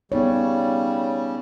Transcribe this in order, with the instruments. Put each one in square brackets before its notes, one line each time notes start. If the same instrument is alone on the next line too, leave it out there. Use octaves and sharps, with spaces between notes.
[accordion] C#3 G3 [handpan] B3 D#4 C#5